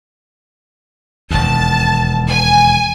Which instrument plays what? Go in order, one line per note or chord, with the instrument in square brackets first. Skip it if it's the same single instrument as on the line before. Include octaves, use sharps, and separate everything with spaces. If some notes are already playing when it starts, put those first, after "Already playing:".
[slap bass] E1 D#2 [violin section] A5
[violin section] G#5